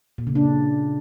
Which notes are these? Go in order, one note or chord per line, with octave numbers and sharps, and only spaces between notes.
A#2
C#3
D4